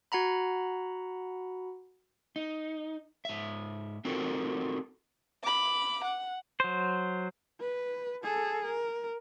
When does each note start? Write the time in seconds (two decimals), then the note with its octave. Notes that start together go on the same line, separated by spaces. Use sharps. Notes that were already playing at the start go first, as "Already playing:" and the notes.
0.12 F#4 F#5 A#5 B5
2.36 D#4
3.25 G#2 E5
4.05 C4 D#4 F4 F#4 A4 A#4
5.43 B5 D6
6.04 F#5
6.60 F#3 C5
7.60 B4
8.24 G#4 A4
8.65 A#4